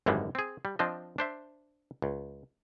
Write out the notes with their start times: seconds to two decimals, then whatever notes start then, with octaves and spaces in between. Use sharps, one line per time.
0.06 G#1 F#2 D3 E3 G3 G#3
0.35 C4 G#4
0.65 G3
0.79 F3 C4 D4 D#5
1.18 D4 C5 E5
2.02 C#2